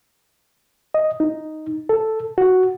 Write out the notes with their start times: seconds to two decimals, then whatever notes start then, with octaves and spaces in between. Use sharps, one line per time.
0.94 D#5
1.20 D#4
1.89 A4
2.38 F#4